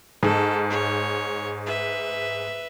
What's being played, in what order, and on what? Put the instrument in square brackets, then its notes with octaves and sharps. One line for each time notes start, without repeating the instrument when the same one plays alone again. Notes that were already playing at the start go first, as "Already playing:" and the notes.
[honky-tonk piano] G#2 [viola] A4
[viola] C#5
B4 E5